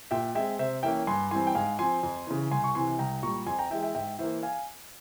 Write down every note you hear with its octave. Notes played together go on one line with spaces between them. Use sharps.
A#2 E5 G5
G#3 C4 E5 G5
C3 C5 E5
E3 A#3 C#4 E5 G5
G2 G#5 C6
E3 G3 C4 G#5 C6
G5
G#2 F5 G#5
F3 C4 G#5 C6
F2
C#3 E3
C2 G#5 C6
C#6
C3 E3 G#5 C6
C2 G5 A#5
A#2 G3 A#5 C#6
F2 G#5 C6
G5 A#5
E3 G#3 E5 G5
E5 G5
G#2 E5 G5
E3 A#3 C5 E5
F5 G#5